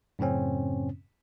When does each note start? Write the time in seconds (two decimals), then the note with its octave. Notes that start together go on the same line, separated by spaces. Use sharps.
0.19 F#2 A2 C#3 C4 C#4